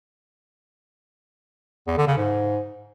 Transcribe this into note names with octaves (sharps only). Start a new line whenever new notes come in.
E2
D3
C#3
G#2